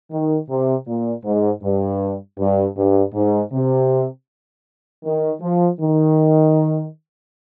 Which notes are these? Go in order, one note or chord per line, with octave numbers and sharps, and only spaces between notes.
D#3
C3
A#2
G#2
G2
G2
G2
G#2
C3
D#3
F3
D#3